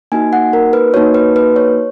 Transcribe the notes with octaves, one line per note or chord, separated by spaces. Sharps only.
A#3 D#4 F#4 G#5
F#5
A#4
B4
A#3 D#4 F#4 C#5
B4
B4
C#5